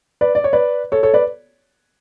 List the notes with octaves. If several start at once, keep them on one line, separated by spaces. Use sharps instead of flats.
B4 D5
D5
C#5
B4 D5
A4 C#5
A4 C#5
B4 D5